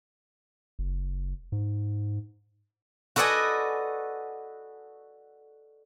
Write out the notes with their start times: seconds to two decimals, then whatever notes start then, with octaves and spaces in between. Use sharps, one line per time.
0.79 F#1
1.52 G#2
3.16 F#4 A4 B4 D5 D#5 G#5